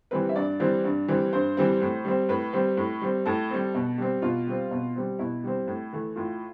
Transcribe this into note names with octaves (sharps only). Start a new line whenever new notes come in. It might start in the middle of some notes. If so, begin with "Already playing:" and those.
E3 G3 C4 B4
E5
G2 D5
E3 G3 C4
G2
E3 G3 C4
G2 C5
E3 G3 C4
A2
G3 C4
A2 B4
G3 C4
A2
G3 C4
A2 A4
G3 C4
B2
G3 C4
B2 F4
G3 C4
B2
G3 C4
B2 E4
G3 C4
A2
E3 A3
A2 F4